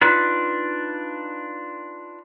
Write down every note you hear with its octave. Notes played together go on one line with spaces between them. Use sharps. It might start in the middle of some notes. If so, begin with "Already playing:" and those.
D4 D#4 F4 B4